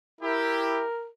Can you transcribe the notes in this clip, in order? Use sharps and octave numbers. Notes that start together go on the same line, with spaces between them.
E4 G4 A#4